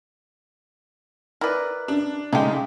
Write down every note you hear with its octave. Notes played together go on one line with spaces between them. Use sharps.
E4 A#4 B4 D5
D4
C#3 G#3 A3 D4 D#4 G4